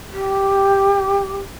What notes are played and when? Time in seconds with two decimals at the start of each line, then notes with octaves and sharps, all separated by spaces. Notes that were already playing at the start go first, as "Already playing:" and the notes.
0.11 G4